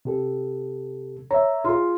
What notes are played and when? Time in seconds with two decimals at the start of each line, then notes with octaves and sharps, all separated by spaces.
0.05 C3 G4 A4
1.31 C#5 E5 A#5
1.64 F4 G#4